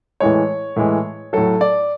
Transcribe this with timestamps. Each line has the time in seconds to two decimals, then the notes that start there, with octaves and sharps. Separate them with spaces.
0.20 A2 E3 G#3 C#5
0.76 A2 E3 G#3
1.33 A2 F#3 A4
1.61 D5